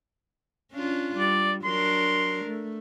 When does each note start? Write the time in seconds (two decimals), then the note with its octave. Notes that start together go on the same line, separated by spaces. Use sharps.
0.73 C#4 D4 F4
1.17 G3 D5
1.64 F#3 D4 A#4 C6
2.45 A3